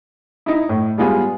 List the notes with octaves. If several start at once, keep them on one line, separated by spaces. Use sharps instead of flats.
D#4 E4
A2
G3 G#3 B3 F4 G#4